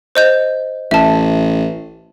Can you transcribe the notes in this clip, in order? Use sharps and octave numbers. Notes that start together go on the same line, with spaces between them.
C5 D#5 G6
A1 E5 A5